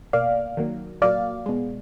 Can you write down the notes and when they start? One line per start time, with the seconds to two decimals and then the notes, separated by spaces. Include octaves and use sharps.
0.13 B2 A#3 D5 F5
0.57 D#3 F#3 A#3
1.01 A#2 F#3 A#3 D5 F5
1.46 B2 G#3